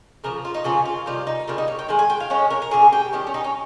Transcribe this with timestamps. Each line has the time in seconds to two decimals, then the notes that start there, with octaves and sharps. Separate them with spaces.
0.24 C#3 F3 A#3 A#4
0.45 F4
0.54 D#4
0.64 C#3 F3 A#3 C#4 F4
0.85 F4
1.06 C3 D#3 G3 F4
1.27 D#4
1.48 C#3 G3 A#3 F4
1.58 D#4
1.68 C#5
1.79 G5
1.89 D#3 G#3 G#5
1.99 G#5
2.10 G5
2.20 F5
2.30 D#3 G#3 C#4 C#5
2.50 A#4
2.62 A#4
2.71 C#3 F3 A#3 C#4 G#4
2.92 G4
3.13 D#3 G3 C#4 G4
3.27 C#4
3.34 D#4
3.44 C#4